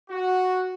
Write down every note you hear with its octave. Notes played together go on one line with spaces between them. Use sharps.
F#4